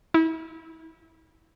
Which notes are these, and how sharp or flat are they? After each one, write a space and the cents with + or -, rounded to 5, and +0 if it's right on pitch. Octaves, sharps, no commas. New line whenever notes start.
E4 -30